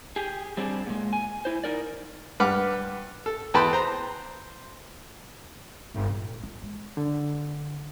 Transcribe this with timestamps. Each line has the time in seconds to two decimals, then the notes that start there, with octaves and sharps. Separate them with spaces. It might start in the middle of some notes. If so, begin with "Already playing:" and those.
0.16 G4 G#4
0.57 G3 C4 D4 G#4
0.87 A#2 G#3
1.13 G#5
1.45 E4 C5
1.64 D#4 A#4 D5
2.40 G2 B4 F#5 D6 F6
3.26 A4
3.54 E2 B4 G5 A5 B5 C6
3.73 C5 A#5
5.94 G1
6.10 A#2
6.43 F4
6.62 G#3
6.97 D3